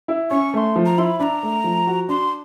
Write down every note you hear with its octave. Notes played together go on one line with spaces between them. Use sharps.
E4
C#4 C#6
A3 C6 C#6
F3
A#5
E4 C6
B5
D4 A#5 B5
A3
F3
F#4
D4 C6